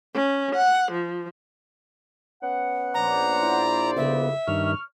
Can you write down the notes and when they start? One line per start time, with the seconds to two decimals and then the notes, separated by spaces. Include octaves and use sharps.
0.14 C#4
0.55 F#5
0.92 F3
2.43 B3 C#4 F#5
2.94 A#1 C5 D5 A#5
3.43 E4
3.97 C2 F2 C#3 B3 E5
4.48 G2 D#3 C#6 F6